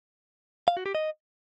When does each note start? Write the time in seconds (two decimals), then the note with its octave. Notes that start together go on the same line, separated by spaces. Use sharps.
0.68 F5
0.77 F#4
0.86 G4
0.95 D#5